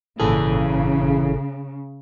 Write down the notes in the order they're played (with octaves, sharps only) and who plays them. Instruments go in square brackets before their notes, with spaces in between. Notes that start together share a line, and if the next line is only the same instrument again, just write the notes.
[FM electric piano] G#1 A#2 A4 [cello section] C#3 [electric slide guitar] E3 G#4